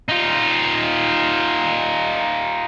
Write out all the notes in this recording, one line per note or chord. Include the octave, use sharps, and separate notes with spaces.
D#4 F4